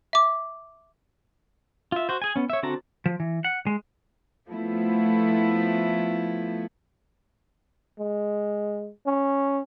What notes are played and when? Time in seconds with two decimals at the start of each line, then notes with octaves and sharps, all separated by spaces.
0.13 E5 D6
1.92 F4 E5
2.09 F#4 C5
2.22 G#4 G#5
2.36 B3 C#4
2.50 C#5 E5
2.63 D3 C4 F#4 A5 A#5
3.06 F3
3.20 E3
3.44 F#5
3.67 G#3
4.50 F3 A3 B3 E4
7.99 G#3
9.07 C#4